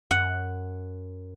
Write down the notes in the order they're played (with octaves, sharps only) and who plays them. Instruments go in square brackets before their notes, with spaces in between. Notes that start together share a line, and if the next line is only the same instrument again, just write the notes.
[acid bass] F#2 [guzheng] F#5